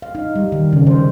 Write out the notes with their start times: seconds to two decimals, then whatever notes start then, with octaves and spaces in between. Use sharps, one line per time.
0.02 F5
0.15 D#4
0.36 G3
0.52 D#3
0.73 C#3
0.87 C5